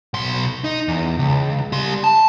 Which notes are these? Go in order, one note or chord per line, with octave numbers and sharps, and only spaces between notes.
B1 C6
D#4
E2
C#2
G3 C6
A5